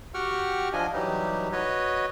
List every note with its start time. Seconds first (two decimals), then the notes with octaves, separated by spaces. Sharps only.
0.14 F#4 G4 F#5 G5 C#6 F6
0.73 F3 D4 F4 D#5 G#5
0.93 E3 F#3 G3 D#4 G4
1.52 F#4 B4 C#5 D#5